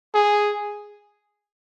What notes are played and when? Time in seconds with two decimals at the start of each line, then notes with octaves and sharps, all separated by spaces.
0.14 G#4